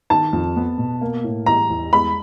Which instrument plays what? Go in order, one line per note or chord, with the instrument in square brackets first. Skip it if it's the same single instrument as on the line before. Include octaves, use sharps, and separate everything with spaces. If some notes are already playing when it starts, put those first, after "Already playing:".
[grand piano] D#3 [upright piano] A5
[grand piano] F2
B3
B2
A#3
A2
[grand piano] E3 [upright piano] A#5
[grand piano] E2
[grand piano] G#3 [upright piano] B5